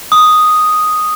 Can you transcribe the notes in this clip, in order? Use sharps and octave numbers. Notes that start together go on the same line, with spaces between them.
D#6